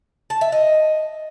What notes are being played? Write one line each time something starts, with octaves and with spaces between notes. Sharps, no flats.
A5
E5
D#5